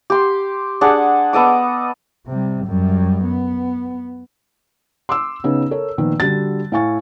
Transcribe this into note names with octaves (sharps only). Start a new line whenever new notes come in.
G4 C6
D4 G#4 F#5
B3 A4 D#5 D6
C3 G3
F#2 G3
B3
C6 D6 E6
C#3 B3 D#4
A4 A#4 C#5
A#2 D#3 F3 B3
D3 G3 F#4 A6
A2 E4 F5 G#5 C#6 A6